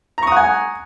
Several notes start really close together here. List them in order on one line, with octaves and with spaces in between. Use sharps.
A#5 C#6 D#6 F#5 G#5